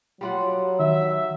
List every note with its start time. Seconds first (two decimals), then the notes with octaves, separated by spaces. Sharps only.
0.21 F#3 G3 F4 F#5
0.80 D#3 E5